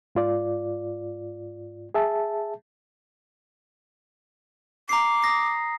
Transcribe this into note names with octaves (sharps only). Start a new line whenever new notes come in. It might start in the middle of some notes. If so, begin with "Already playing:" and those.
G#2 F4 D5
G#4 E5 A5
A#5 D6 C7
D#6 A#6 C7